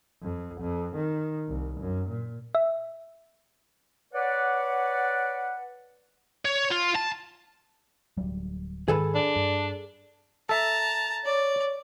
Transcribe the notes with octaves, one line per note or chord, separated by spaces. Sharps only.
F2
F2
D#3
C2
F#2
A#2
E5
B4 C#5 D5 F#5
C#5
F4
A5
D1 F#3 G3
G#2 D#3 G#4 A4 B4
D4
G2
A4 E5 A5 A#5 A6
C#5 D5